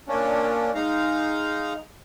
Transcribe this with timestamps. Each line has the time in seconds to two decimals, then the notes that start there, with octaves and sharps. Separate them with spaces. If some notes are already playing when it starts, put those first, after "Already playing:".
0.08 A#2 A#3 C#4 D4
0.75 G#3 D#4 F5 A#5